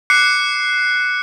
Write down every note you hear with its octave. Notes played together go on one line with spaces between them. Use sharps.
D6 F#6 C7 C#7